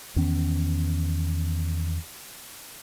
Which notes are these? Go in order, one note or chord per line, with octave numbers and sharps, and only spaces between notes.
E2 D#3 B3 C#4